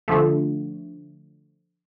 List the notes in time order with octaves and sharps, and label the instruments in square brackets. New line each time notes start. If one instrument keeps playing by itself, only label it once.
[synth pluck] D3 F3 A3